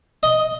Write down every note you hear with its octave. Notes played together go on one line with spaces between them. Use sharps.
D#5